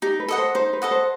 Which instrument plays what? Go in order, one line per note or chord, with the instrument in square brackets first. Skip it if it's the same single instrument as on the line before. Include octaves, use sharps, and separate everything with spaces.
[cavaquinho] D#4 [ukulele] G4
[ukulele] B4
[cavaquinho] A4 D#5 F#5
[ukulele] C5
[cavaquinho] D#4 [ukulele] C5
[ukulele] B4
[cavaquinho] A4 D#5 F#5
[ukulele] C5